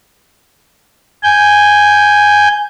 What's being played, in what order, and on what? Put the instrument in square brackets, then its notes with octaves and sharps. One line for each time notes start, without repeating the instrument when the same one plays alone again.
[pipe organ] G#5 G6